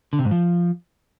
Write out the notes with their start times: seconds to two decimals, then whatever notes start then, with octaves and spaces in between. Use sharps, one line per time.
0.13 D3
0.19 C3
0.25 G#2
0.31 F3